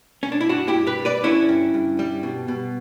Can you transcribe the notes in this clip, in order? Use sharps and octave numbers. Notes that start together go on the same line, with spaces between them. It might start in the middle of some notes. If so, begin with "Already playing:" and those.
C#4
D4
E4
G2 D4 F#4
E4 G4
G2
G4 B4
G3
B4 D5
D3 C#4 E4
G2
G2
G3
B2
B2